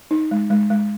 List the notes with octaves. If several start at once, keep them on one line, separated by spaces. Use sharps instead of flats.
D#4
G#3
G#3
G#3